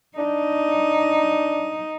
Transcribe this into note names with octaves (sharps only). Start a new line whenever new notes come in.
D4 D#4